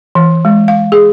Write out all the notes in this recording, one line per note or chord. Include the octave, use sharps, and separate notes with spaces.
E3
G#3
F5
G#4